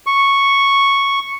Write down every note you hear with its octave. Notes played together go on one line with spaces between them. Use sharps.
C#6